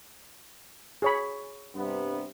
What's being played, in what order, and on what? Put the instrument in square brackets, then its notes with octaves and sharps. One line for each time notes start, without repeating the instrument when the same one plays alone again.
[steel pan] G#4 C#5 B5
[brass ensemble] G2 C3 B3